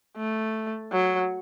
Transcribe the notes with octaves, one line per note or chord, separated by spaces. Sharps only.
A3
F#3